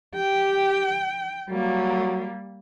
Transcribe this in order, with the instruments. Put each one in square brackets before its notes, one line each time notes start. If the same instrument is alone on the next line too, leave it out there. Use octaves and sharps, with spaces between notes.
[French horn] G4 [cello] G5
[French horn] F#3 [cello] G3 A#3